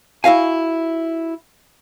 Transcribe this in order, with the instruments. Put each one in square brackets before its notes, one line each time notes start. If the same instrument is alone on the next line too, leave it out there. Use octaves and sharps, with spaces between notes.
[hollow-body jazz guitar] E4 F#4 F5 G#5